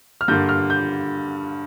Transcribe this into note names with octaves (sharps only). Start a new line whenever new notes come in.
F6
G2 D3 A#3 G6
F6
G6